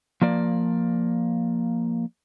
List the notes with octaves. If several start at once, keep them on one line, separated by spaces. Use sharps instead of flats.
F3 A#3 D5